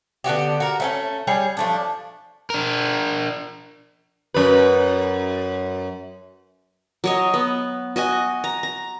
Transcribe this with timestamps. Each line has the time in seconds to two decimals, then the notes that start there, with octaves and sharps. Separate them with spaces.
0.24 D3 B3 F#4 G4
0.60 F#4 A#4
0.80 A3 C4 C#4
1.27 G3 G#4 C#5
1.57 F3 A3 D4
2.50 D4 A#4
4.34 F#2 B4
7.04 F#3 C#5 D#5
7.34 B3
7.96 F#4 D#5 G#5
8.44 A#5
8.63 A#5